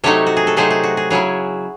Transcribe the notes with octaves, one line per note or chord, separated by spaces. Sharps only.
C3 F#3 A3 D#4 A4 C#5
F#4
G#4
A4
C3 F#3 A3 D#4 G#4 C5
G#4
F#4
G#4
C#3 F#3 C#4 E4 G#4